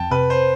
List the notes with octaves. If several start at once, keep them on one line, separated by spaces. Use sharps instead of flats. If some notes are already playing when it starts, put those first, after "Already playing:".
Already playing: F2 G5 A5
C3 B4
C5